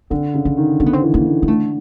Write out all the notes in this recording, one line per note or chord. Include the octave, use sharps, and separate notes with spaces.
D3 C4
C#3
C#4
D#3
D3 C4
B3
C4
E3
A#3
D#3
A#3
D3 A3